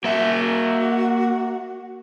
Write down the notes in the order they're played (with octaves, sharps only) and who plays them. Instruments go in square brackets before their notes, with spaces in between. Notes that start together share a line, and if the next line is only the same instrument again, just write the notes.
[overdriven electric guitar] A#3 E5 [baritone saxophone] F#4